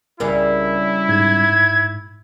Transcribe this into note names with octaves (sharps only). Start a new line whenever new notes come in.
C2 G2 C#3 G3 E4 A#4
G#2 G#6